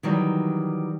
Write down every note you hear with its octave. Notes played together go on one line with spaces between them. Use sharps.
D#3 E3 F#3 G3